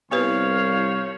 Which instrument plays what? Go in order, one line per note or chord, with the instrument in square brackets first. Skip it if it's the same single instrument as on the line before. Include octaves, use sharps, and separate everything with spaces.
[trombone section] C2 [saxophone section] F3 C#5 [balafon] B3 G4 B4 [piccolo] F5